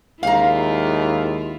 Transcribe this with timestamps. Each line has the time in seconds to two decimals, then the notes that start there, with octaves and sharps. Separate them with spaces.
0.23 D#2 G#3 E4 F4 F5 A#5